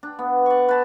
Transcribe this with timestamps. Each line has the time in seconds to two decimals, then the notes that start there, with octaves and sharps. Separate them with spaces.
0.03 D4
0.19 B3
0.46 D5 C#6
0.69 B4 A5